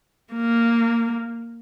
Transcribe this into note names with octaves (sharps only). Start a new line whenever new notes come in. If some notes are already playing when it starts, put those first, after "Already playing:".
A#3